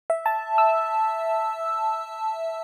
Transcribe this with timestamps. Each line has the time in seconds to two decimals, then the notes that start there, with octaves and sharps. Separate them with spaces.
0.10 E5
0.26 A5
0.58 E6